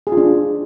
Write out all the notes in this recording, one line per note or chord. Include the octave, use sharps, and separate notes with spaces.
G#4
F4
D4